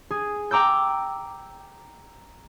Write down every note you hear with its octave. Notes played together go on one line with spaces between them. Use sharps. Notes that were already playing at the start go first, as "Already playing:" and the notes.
G#4
G5 A#5 D6 E6 G6